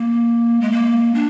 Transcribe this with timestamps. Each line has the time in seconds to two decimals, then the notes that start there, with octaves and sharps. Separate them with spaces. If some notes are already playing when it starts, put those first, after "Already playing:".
Already playing: A#3
0.61 G#3
0.72 A#3
1.14 D4